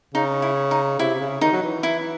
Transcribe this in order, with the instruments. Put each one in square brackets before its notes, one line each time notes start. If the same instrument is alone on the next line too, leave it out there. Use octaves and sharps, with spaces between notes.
[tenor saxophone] C#3 [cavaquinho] D#4
[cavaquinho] E4
D#4
[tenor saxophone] C3 [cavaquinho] E4
[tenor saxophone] C#3
[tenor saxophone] D#3 [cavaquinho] D#4
[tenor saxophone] F#3
E3
[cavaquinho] E4